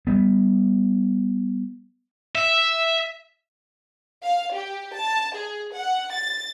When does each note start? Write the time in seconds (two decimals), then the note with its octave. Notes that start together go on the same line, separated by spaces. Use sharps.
0.07 G3 B3
2.35 E5
4.23 F5
4.53 G4
4.95 A5
5.36 G#4
5.72 F#5
6.12 A6